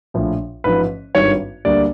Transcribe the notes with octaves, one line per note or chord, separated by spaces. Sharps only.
A#1 A2 F3
A1 G#2 F3 B4
G#1 G2 D#3 G3 C#5
D2 D3 G3 A#3 D5